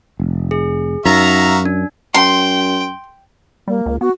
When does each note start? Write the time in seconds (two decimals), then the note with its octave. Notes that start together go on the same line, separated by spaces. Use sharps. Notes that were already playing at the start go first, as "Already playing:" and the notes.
0.20 F1
0.51 G#4
1.06 F#2 D#4 F#4 E5 F5 A#5
1.65 D4
2.14 F#2 G5 C6
3.68 G3 A#3
3.86 C#2
4.01 B3 F#4